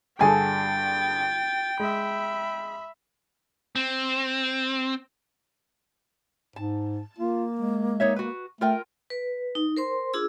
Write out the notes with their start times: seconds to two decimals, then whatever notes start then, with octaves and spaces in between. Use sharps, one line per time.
0.21 G2 D3 G#4 A4 G5 G#5 A6
1.80 G#3 E5 B5
3.76 C4
6.56 G#2 A5
7.19 A#3 F4
7.59 G#3
8.00 D#4 C#5 E5
8.16 F#4 B4
8.61 A3 F4 A#4 G5
9.10 B4
9.55 D#4
9.77 A#4 C5 C6
10.13 D4 F4 G#4 E6